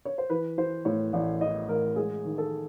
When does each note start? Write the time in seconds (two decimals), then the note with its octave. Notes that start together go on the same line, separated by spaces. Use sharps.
0.05 C#5
0.18 C5
0.30 E3 B4
0.58 E3 C5
0.85 A2 C#5
1.13 A1 D5
1.41 E3 D#5
1.69 A1 A#4
1.96 G#3 G#4
2.25 D#3
2.38 A4